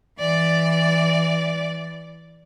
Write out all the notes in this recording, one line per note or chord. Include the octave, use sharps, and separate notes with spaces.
E3 D5